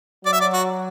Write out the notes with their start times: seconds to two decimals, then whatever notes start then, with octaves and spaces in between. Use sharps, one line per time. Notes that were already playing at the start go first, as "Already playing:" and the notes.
0.25 F#3 D5
0.32 E5
0.40 D5
0.53 F#4